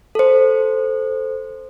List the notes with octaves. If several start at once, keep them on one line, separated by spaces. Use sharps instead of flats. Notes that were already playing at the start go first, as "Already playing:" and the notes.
A4 C5